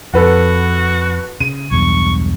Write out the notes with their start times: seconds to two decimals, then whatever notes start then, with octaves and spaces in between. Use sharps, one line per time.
0.14 F2 F#4 A4 B4 F#5
1.40 C#3 D#7
1.71 B1 E2 G2 C#6